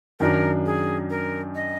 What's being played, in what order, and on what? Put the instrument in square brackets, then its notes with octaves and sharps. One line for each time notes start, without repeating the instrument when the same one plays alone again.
[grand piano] F#2 D#3 F#3 D4 [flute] A#4
[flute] G#4
A#4
D#5